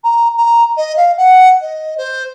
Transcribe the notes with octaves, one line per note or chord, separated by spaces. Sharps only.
A#5
A#5
D#5
F5
F#5
D#5
C5